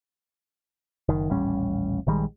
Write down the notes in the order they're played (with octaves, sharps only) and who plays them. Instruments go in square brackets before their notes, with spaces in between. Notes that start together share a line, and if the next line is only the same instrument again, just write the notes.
[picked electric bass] F#1 D#3
D#1 A1 G3 C#4
A#1 D#3 G3 G#3